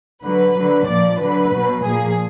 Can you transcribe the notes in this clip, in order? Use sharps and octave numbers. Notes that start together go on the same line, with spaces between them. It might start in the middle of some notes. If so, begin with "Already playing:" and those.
D3 F#3 B4
D3 F#3
A#2 F3 D5
D3 F#3 B4
B2 F#3
A#2 F3 G#4